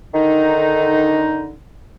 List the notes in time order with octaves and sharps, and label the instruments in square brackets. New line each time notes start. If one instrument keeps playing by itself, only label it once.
[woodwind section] D3 D#4 [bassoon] D#3